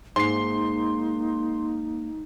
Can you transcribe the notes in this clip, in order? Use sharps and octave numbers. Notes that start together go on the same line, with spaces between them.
G#2 A#3 D#4 C6 C7